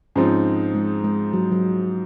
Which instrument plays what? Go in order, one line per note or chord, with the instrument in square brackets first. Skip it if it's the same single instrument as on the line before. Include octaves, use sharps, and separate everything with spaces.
[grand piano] G#2 F3 C4 D#4 [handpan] C#4
[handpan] G#3
G#3
F#3
F#3